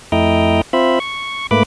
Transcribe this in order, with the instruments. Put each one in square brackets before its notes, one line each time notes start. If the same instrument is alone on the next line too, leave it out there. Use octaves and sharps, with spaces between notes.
[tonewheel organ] F2 A3 E4 D#5 G5 A#5
C4 F4 C5 E5 B5
C#6
G#2 A3 A#3 B4 B5 D6